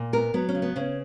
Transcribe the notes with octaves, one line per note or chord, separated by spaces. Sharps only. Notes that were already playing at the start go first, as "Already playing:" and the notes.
Already playing: A#2
B3 A#4
F#3 B3
C#4
C#3
B3
C#3 C#4